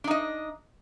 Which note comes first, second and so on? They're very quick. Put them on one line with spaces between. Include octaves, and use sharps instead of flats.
D4 D#4 D#5